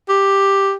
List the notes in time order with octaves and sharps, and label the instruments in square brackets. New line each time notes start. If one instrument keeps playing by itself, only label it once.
[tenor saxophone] G4